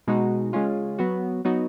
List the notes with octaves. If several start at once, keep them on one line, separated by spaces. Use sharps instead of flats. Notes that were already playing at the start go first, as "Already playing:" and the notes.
B2 G#3 D#4 F#4
C#3 G#3 C#4 F4
F#3 B3 F#4
F#3 B3 D#4 F#4